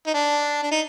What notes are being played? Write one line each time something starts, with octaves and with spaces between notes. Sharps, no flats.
D#4
D4
D4
D#4